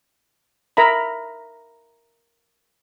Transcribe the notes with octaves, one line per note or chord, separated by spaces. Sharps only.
A#4 E5 A#5 B5